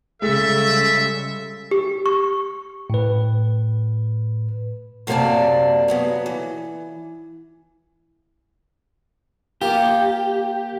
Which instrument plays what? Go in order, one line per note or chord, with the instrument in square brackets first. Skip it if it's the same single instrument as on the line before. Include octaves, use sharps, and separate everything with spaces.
[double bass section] C#3 G3 [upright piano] G#3 [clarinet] A4 [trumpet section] E5
[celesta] G4
C#6
[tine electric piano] A2 B4
[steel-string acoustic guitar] F#2 C3 A#3 D#4 D5 A5
C#3 F#3 B3
E3
[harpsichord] A#3 F4 [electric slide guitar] G4